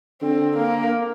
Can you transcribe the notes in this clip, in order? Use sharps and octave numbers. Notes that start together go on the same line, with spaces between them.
D3 C4
A#3